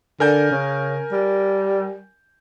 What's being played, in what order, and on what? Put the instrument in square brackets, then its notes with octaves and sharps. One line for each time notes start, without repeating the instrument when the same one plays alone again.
[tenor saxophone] D3 [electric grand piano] A#4 G#5 G6
[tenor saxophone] C#3
G3